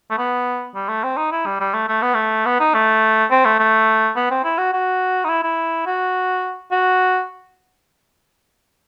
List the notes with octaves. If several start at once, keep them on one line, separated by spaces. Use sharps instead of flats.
A3
B3
G3
A3
C4
D#4
E4
G3
G3
A3
A3
B3
A3
B3
D#4
A3
C4
A3
A3
B3
C4
E4
F#4
F#4
D#4
E4
E4
F#4
F#4